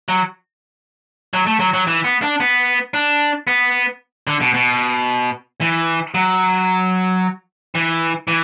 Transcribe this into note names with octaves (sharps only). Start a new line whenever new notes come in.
F#3
F#3
A3
F#3
F#3
E3
B3
D4
B3
D4
B3
D3
B2
B2
E3
F#3
E3
E3